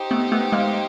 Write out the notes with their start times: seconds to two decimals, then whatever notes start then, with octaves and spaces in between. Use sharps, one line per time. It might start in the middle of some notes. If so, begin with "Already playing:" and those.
Already playing: D#4 G4 C5
0.11 A3 B3
0.32 A3 B3
0.52 G#3 A#3